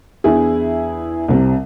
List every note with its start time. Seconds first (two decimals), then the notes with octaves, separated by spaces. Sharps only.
0.24 E2 D4 E4 G#4
1.28 C2 C3